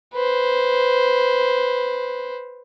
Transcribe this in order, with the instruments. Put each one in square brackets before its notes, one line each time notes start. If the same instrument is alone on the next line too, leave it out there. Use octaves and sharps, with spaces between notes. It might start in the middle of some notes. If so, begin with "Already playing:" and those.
[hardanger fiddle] B4 C5